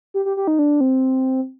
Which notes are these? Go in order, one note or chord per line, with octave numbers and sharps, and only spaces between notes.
G4
G4
G4
D#4
D4
C4